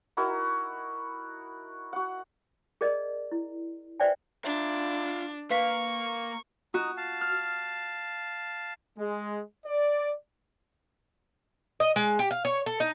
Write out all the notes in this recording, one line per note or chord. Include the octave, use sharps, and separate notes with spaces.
D#4 E4 F#4 A#4
F#4 F#5
G#4 A#4 D5 D#5
E4
B4 C5 D5 E5 G5 G#5
D4 F4 E5
A#3 A#4 B4 F5 C#6 B6
D#4 F#4 D#6
F5 A5
F6
G#3
D5
D#5
G#3
G4
F5
C#5
A4
D#4